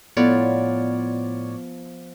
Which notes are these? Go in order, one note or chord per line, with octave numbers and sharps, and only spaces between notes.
A2 F3 B3 C#5 D5